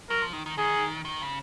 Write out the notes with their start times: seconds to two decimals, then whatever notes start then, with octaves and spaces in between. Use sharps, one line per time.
0.09 F#3 A#4
0.22 F3
0.33 D#3
0.46 D#3
0.58 D#3 G#4
1.05 D#3
1.21 C#3